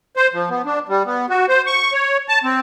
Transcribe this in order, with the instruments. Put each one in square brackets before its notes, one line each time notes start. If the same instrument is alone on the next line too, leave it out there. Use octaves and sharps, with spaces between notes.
[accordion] C5
F3
B3
D4
G3
B3
F#4
C5
C#6
C#5
A5
C4